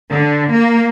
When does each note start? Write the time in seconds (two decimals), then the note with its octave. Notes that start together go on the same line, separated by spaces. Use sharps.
0.12 D3
0.52 A#3